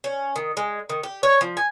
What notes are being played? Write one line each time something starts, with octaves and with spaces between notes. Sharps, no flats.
C#4
D#3
G#3
D#3
G4
C#5
F3
G#5